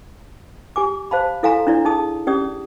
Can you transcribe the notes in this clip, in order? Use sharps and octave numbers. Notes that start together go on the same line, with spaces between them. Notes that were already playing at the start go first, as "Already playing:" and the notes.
G4 G#5 D6
C5 F5 A5 B5
E4 A4 F5 G#5 A#5 C6
D4 E4 D5
D#4 G#4 A5 D#6
C#4 G4 D5 D#6